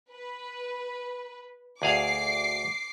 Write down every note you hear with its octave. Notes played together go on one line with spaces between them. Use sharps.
B4
D2 G#4 F5 D6 C7